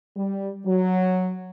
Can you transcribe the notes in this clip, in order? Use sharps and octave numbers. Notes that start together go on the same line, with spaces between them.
G3
F#3